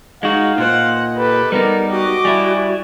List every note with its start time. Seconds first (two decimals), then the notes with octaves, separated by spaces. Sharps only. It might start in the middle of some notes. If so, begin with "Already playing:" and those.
0.23 G#3 D#4 F#4 F5
0.58 A#2 C5 D#5 F#5
1.17 G4 A4 B4
1.52 G3 B3 D#4 G4 A#4
1.90 F#4 G4 D#5 D6
2.25 G3 E4 G#5